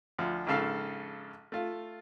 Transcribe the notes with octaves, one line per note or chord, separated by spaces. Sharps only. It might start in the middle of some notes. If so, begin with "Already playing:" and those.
D2 F3
A#1 G#2 C#3 A4 F5
A3 F4